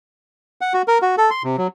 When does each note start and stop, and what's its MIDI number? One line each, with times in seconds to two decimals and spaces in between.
0.61 0.73 78
0.74 0.82 66
0.88 0.98 70
1.02 1.16 66
1.18 1.30 69
1.31 1.43 84
1.44 1.56 48
1.58 1.67 54